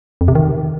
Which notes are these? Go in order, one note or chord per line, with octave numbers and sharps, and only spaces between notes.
F2
C3
D#3